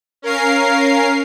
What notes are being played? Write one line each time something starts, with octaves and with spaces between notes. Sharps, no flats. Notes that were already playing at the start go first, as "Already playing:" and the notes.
C#4 A#4 F5 C7